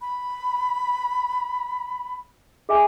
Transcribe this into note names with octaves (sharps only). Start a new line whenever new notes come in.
B5
G#4 E5 G#5